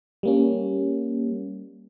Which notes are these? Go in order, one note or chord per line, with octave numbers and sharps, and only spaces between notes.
G3 A#3 C#4